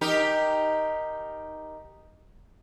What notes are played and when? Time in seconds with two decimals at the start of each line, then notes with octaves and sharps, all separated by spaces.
0.01 D#4 G4 A#4